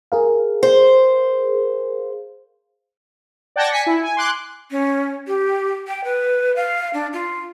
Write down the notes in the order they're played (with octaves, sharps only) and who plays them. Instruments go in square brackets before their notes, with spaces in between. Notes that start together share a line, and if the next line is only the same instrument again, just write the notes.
[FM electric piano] G#4 A#4 F5
[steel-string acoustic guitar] C5
[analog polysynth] D5 F#5 G5 A5 G#6 A#6
G#5 B6 C#7
E4
G#5
C6 D6 F#6
[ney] C#4
G4
G5
B4
F5
D4
F4